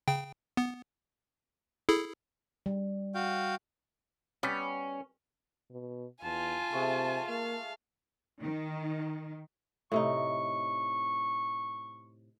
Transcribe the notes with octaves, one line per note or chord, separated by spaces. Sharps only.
C#3 G5
B3
E4 G#4 A4
G3
F#4 F5 G5
G3 B3 C#4
B2
E2 F4 G#5 A5
C3 G#3 A3
A#3 F5
D#3
A2 C3 D#4 C#6